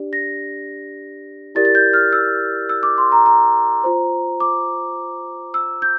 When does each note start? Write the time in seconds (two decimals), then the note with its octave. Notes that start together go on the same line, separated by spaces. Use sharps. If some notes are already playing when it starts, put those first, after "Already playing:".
Already playing: D4 G4 D5
0.13 A#6
1.55 E4 G4 A#4 D5 A6
1.65 A6
1.75 G6
1.93 F6
2.13 E6
2.69 E6
2.83 D6
2.98 C6
3.12 A#5
3.26 A#5
3.84 F4 C5
4.40 D6
5.54 E6
5.82 G6